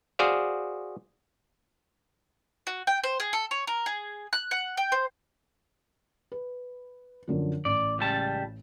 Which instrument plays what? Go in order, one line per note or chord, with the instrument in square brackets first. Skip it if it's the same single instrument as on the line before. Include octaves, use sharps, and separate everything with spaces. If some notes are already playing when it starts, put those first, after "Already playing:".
[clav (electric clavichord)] F#4 G#4 C5 D5 F5
[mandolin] F#4
G5
C5
G#4
A4
C#5
A#4
G#4
F#6
F#5
G5
C5
[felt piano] B4
F#2 D3 F3
[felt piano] A1 [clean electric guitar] D5
[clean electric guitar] C#2 G3 A5